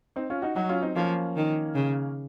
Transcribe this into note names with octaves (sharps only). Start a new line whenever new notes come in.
C4 D#4
C#4 F4
D#4 F#4
F#3 D#4 F#4
C#4 F4
C4 D#4
F3 A#3 C#4
D#3
C#3